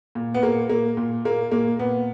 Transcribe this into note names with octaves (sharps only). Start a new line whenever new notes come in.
A#2
B3
A#2 A#3
A#2 A#3
A#2
A#2 A#3
A#2 A#3
A#2 B3